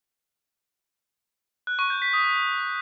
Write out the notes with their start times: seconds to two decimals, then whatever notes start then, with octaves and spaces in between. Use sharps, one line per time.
1.67 F#6
1.79 C#6
1.90 G6
2.02 B6
2.13 D#6